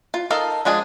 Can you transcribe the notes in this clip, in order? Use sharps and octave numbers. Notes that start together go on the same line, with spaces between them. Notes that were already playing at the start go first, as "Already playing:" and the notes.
F4
D#4 A4 A#4 F5
F3 G#3 D4 G#4